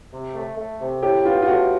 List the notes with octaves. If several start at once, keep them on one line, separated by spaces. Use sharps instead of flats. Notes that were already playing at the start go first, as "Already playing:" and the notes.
C3
A3
A3
C3
A2 G4
B3 F4
F4
A2 F#4